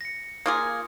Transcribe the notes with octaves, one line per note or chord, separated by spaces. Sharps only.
A#6 C#7
A#3 F4 G#4 D6 D#6